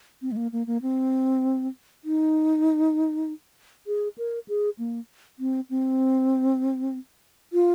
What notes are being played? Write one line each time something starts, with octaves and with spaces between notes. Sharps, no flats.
C4
G#3
A#3
A#3
A#3
C4
D#4
G#4
A#4
G#4
A#3
C4
C4
F4